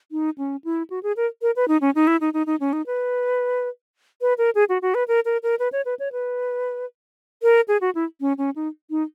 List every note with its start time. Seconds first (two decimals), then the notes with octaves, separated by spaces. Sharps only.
0.12 D#4
0.38 C#4
0.64 E4
0.90 F#4
1.03 G#4
1.17 A#4
1.42 A#4
1.56 B4
1.68 D#4
1.81 C#4
1.95 D#4
2.07 E4
2.21 D#4
2.34 D#4
2.47 D#4
2.60 C#4
2.73 D#4
2.86 B4
4.21 B4
4.38 A#4
4.55 G#4
4.69 F#4
4.82 F#4
4.95 B4
5.08 A#4
5.25 A#4
5.43 A#4
5.59 B4
5.72 C#5
5.85 B4
5.99 C#5
6.12 B4
7.43 A#4
7.68 G#4
7.81 F#4
7.95 E4
8.21 C#4
8.38 C#4
8.56 D#4
8.90 D#4